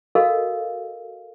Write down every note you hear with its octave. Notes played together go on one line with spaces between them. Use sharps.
F#4 A4 A#4 D#5 F5